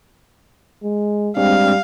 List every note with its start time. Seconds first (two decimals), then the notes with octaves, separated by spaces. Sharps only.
0.84 G#3
1.37 G3 G#3 C4 D4 F5